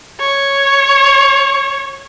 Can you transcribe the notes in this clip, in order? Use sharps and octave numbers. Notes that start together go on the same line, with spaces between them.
C#5